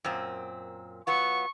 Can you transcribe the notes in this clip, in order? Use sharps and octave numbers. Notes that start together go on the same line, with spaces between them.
F#2 A#2 C4
F#3 B3 F4 C#6